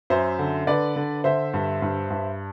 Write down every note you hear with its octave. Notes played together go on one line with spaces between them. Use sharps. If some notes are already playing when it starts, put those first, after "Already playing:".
F#2 C5 E5
D3
D3 B4 D5
D3
D3 C5 E5
G2
G2
G2